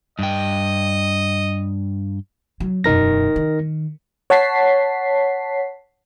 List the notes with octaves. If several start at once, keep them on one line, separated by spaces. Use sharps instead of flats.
G2 D#5 G5
F#3
E1 F#2 D#4 A#4 A#6
D#3
C#5 F#5 A5 B6 C7